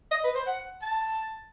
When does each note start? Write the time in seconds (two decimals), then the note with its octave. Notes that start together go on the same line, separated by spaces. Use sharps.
0.11 D#5
0.24 B4
0.35 C5
0.47 F#5
0.82 A5